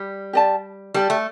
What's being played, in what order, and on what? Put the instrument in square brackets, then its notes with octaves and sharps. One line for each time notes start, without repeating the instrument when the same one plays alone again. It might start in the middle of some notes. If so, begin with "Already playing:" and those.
Already playing: [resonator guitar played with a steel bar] G3
[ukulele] G4 D5 A5
[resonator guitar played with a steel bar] G3 [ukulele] G4 D5 A5
[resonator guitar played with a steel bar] A3